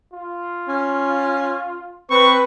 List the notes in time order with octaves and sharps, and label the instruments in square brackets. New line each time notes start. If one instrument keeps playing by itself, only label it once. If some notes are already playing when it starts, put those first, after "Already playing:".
[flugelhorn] F4
[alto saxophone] C#4
[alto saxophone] C4 [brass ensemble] B4 [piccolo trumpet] C#6